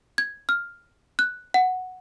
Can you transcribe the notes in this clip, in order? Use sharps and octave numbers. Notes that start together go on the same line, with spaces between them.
G#6
F6
F#6
F#5